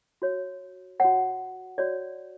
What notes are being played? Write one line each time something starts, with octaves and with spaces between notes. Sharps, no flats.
F#4 C#5
F#4 C#5 F#5
F#4 C#5 D5